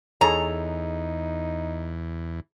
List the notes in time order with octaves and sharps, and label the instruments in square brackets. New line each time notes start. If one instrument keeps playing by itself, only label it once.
[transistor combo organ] E2 [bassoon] D#4 [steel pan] G#4 A4 C#5 [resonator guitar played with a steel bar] A#5